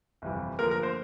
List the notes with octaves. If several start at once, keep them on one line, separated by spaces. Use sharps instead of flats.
G1 F2 C3 E3 G3
D2 D3 F3 A#3 A#4
A#4
C5